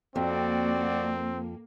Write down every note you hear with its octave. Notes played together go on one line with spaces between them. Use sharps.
F2 A#3 C4 F#4 D5